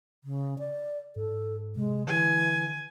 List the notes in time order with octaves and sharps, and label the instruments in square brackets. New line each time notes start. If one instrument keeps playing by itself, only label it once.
[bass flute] C#3
D5
[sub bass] G#2 [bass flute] A4
[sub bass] C3 [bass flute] G#3
[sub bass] D3 [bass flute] E3 [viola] G#5